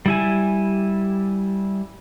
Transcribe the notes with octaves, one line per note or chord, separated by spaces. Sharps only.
G3 E4 G#5